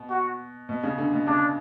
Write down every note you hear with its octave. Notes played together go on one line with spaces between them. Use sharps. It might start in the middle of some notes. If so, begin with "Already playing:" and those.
Already playing: B2
F#4
B2
C#3
D3
B2
C#3 D4